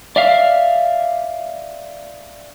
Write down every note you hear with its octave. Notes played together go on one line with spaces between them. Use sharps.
D5 E5 F5